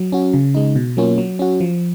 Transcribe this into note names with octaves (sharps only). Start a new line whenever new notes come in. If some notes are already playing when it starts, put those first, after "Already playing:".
Already playing: F#3
C#4 F#4
C#3
G#3 D#4
B2
F#3 A#3 C#4 F4
F#3
C#4 F#4
F3